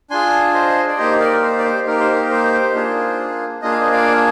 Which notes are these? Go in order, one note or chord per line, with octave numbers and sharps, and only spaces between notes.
D4 F4 G#4 G#5 C6
C5 D#5
D5
A#3 D#4 G4 C5 D#5
A#4 D5
C5
D5
C5
A#3 D#4 G4 A#4
C5
A#4
C5
A#3 D4 F4 G#4
A#3 D4 F4 G#4 D#5
F5
C5 D#5
D5 F5